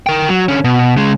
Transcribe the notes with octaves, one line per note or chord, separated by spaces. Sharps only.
A#4 G5
F#3
D3 C#4
B2
C#3 G#3